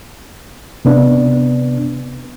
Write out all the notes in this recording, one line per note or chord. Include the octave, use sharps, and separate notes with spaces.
C3 B3 D4